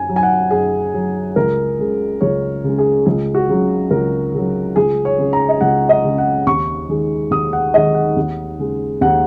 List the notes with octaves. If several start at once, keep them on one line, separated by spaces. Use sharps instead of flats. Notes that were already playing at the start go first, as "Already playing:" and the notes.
Already playing: F#2 G#5
F#3
G#5
F#5
F#2 G#4
F#3
C#2 A#4
C#3 G#3
C#2 C#5
C#3 G#3
G#4
C#2 G#4
F#4
C#3 F#3
C#2 A#4
C#3 F#3
C#2 G#4
C#5
C#3 G#3
A#5
D#5
C#2 F#5
D#5
C#3 G#3
F#5
D#2 C#6
D#3 G#3
D#2 D#6
F#5
D#3 G#3 D#5
F#5
D#2
C#3 G#3
D#2 F#5